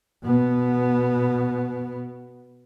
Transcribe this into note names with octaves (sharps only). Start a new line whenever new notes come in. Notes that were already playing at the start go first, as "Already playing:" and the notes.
B2 B3